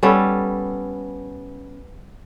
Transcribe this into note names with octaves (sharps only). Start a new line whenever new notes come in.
G3 B3 C#4 A4